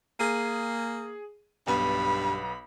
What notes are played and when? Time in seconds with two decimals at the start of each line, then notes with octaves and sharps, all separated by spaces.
0.20 A#3 G#4 D#7
1.67 B1 G2 B3 B5